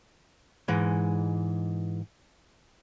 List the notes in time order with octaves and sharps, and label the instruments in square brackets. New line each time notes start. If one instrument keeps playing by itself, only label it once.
[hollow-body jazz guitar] G#2 E3 G#3